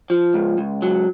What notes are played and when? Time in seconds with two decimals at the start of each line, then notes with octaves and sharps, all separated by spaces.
0.10 F3
0.34 C#2
0.58 C#2
0.82 F#3